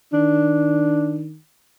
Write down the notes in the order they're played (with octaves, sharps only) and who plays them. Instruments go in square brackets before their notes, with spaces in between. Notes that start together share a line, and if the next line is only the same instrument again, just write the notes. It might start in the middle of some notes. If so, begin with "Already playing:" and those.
[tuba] D#3 [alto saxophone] D4